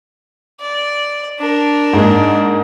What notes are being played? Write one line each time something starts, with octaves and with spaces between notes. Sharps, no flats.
D5
D4 A#4
G#2 G#3 A#3